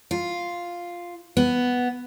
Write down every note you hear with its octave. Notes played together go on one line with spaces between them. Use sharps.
F4
B3